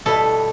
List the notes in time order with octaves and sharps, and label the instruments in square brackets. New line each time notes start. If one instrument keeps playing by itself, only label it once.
[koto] B2 G3 B3 E4 A4